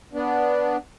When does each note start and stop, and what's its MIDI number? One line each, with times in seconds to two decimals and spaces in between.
0.13 0.77 59
0.13 0.77 62